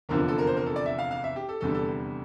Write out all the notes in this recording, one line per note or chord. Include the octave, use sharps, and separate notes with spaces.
F1 E2 D3 F3 A#4
A4
A#4
C5
A#4
A4
D5
E5
F5
F5
E5
G4
A4
F1 E2 D3 G3 A4
A4